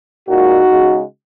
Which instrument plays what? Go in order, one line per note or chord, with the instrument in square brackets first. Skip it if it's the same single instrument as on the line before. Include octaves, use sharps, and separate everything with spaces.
[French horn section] A#2 G#3 D#4 F#4
C#3 G#3